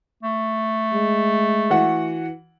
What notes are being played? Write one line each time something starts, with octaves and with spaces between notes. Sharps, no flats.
A3
G#3
E3 F#4 F#5